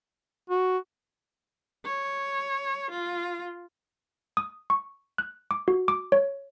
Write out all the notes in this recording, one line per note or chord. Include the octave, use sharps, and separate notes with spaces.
F#4
C#5
F4
D#6
C#6
F#6
D6
F#4
D6
C#5